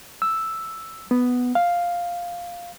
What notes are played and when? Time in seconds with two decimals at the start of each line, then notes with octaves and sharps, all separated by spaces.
0.22 E6
1.11 B3
1.55 F5